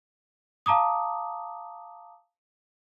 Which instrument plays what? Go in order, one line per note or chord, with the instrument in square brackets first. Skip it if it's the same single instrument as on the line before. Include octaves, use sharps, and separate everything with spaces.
[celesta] F5 A5 A#5 D6 D#6